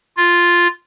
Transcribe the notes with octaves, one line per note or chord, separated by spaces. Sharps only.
F4